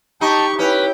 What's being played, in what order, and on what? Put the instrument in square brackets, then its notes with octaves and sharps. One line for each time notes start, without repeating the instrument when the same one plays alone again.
[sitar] D#4 [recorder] G4 [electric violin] G5 C#6 [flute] A5
[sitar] C#4 [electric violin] E4 G5 [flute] B4